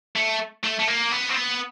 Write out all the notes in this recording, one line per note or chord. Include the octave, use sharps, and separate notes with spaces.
A3
A3
A3
A#3
B3
C4
B3